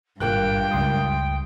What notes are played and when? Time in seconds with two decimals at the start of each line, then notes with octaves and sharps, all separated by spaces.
0.20 G#1 G2 A#2 A#3 G5 F#6
0.71 C#2 C6 D#6